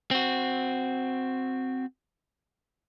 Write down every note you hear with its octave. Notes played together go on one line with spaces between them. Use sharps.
C4 F#4